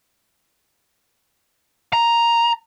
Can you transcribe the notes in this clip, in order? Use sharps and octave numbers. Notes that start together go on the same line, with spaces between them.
A#5